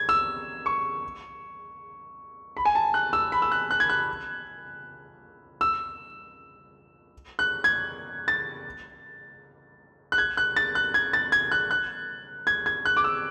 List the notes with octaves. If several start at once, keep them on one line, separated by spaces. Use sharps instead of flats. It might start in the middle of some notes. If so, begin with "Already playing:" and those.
Already playing: G#6
E6
C#6
B5
G#5
A5
F#6
E6
B5
E6
F#6
F#6
G#6
F#6
E6
F#6
G#6
A6
F#6
G#6
F#6
A6
F#6
G#6
A6
G#6
F#6
F#6
G#6
G#6
F#6
D6
E6